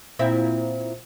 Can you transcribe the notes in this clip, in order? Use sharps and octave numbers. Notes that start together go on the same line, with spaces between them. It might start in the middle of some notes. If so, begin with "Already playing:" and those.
A#2 C4 E4